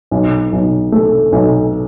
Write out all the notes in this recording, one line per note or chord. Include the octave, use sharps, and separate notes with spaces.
B1
B1
A3
B1